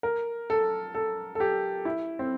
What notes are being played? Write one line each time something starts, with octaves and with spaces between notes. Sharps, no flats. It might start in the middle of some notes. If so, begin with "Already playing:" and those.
A#4
A4
A4
A4
G4
E4
C4